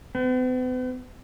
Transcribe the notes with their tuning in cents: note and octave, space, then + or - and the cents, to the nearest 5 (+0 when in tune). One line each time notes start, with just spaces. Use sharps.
B3 +45